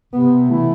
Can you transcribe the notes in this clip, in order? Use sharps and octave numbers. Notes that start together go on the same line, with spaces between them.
C3 B3
E3 A3 E4